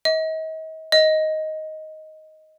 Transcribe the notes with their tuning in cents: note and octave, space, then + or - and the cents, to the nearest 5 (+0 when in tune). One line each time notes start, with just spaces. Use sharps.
D#5 +40
D#5 +10